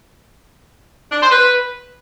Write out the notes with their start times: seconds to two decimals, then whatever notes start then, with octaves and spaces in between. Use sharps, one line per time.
1.11 D4
1.21 C5
1.31 B4